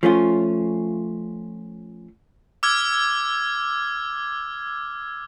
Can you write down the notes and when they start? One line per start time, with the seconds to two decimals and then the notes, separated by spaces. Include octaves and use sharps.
0.03 F3 A3 C#4 F4
2.63 D6 E6 F6 G#6